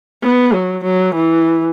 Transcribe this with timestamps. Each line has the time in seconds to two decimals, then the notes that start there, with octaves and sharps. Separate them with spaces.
0.23 B3
0.54 F#3
0.85 F#3
1.15 E3